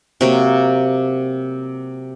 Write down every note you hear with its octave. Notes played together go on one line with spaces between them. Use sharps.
C3 F#3 A#3